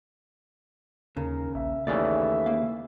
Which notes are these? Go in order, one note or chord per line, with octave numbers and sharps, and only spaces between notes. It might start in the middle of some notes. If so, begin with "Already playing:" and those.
D#2 C#3 A#4
A#1 E5
D#2 C#3 E3 A3 D5 E5
A#3 F5